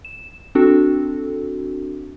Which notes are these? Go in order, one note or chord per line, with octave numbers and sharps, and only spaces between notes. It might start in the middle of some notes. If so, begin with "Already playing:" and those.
E7
C4 D4 F#4 A4